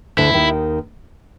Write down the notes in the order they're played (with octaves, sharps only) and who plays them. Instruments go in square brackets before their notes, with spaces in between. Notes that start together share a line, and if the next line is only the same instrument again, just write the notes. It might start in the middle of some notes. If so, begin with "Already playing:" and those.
[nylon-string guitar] D2 D3 [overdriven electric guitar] E4
[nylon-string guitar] D#2 D#3